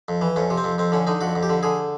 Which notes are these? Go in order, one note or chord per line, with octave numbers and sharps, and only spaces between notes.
F2
E3
F2 C#4
C3
C4
F2
F2 C4
D3 C#4
D3 D#4
F2 F#4
F2
G4
D3
D3 G#4